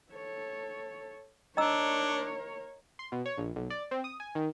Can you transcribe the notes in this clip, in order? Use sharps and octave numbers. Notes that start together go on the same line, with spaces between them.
A4 C#5
D4 A#4 C#5 D#5 A#5 E6
C6
B2
C#5
A#1
B1
D5
C4
D#6
G#5
D#3